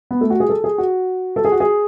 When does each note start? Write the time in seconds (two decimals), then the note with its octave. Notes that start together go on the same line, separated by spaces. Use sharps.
0.11 B3
0.21 A3
0.30 F#4
0.40 G#4
0.49 A4
0.64 G#4
0.78 F#4
1.36 A4
1.45 G#4
1.52 F#4
1.60 G#4